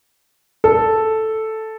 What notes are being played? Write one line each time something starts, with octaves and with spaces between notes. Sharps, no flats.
A4